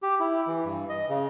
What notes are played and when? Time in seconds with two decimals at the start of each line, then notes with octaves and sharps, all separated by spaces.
0.02 G4
0.20 E4
0.47 E3
0.65 G2
0.89 D#5
1.09 C#3